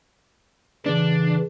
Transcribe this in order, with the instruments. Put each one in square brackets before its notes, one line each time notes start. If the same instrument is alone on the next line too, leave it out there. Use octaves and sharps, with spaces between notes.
[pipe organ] C#3 E3 [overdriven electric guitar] D4